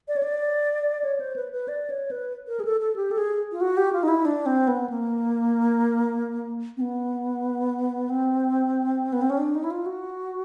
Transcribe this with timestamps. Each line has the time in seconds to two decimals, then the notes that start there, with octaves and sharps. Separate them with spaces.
0.08 D5
0.16 C#5
0.23 D5
1.04 C#5
1.20 C5
1.36 B4
1.52 B4
1.68 D5
1.90 C#5
2.11 B4
2.48 A#4
2.60 G#4
2.65 A4
2.80 A4
2.96 G4
3.11 A4
3.18 G#4
3.52 F4
3.61 F#4
3.77 G4
3.93 F4
4.03 D#4
4.08 E4
4.25 D4
4.46 C4
4.68 B3
4.90 A#3
6.77 C4
6.81 B3
8.09 C4
9.13 B3
9.21 C4
9.30 C#4
9.38 D4
9.55 D#4
9.64 E4
9.70 F4
9.86 F#4